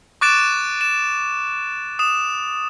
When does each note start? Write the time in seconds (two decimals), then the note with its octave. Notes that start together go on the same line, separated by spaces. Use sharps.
0.21 C#6 D6 F#6 A6 D7 E7
0.81 E7
1.99 D#6 E7